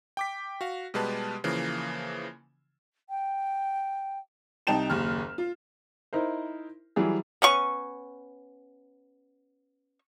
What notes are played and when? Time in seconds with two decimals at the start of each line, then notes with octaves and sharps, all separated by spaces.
0.17 G5 D6 B6
0.61 F#4 F5
0.94 B2 G3 G#3 G4 B4 A5
1.44 C#3 E3 F3 A#3
3.10 G5
4.67 C2 D#4 G5 A5 E7 F7
4.90 F#1 D#2 F6
5.38 F4
6.13 D#4 E4 A#4 C5
6.96 E3 F#3 G3 G#4
7.42 B3 C#4 C#6